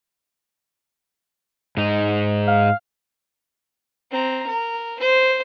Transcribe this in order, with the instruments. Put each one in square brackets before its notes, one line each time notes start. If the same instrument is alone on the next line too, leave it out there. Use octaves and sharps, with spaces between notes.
[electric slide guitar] G#2 D#4
[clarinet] F5
[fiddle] C4 A#5
A#4
C5